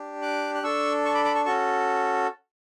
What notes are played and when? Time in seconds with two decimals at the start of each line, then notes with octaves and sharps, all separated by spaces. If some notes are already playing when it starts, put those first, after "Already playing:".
Already playing: D4 G4
0.22 D6 F#6
0.54 F#6
0.63 D4 A4 C#6 E6
1.05 A5 C#6
1.14 B5 D6
1.24 B5 D6
1.35 A5 C#6
1.45 C#4 F#4 A4 A5 C#6